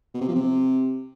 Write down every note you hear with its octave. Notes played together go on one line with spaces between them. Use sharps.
B2
C3
F3
C3